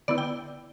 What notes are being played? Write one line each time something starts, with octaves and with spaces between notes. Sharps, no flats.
D3 B3 E4 D5
G5